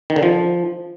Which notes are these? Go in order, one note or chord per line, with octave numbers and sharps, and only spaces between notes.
D#3
D3
F3